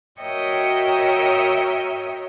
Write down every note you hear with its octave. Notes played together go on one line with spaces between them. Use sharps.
F#4 A#4 C#5 D#5 E5 G5